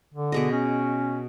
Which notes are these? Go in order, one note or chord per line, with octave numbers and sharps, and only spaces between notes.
D3
B2 G#4 D#5
C#4